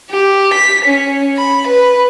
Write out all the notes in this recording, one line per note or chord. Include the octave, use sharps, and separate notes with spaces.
G4
B6
C#4
B5
B4